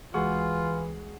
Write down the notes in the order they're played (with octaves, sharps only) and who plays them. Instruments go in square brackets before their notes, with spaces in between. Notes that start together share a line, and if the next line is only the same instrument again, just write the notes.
[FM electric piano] C#2 G#3 F#4 [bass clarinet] E3 [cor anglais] F4 [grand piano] G#4 F#5 C#6